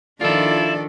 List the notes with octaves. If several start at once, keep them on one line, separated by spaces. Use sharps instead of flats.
D#3 F3 D4 E4 F4 A4 D5